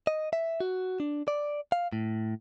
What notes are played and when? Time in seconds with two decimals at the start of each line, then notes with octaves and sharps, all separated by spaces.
0.07 D#5
0.33 E5
0.60 F#4
1.00 D4
1.28 D5
1.72 F5
1.93 A2